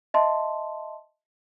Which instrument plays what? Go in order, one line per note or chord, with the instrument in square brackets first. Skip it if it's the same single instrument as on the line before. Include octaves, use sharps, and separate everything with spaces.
[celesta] D#5 E5 A5 C6